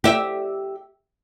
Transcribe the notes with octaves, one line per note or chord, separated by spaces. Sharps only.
G4 E5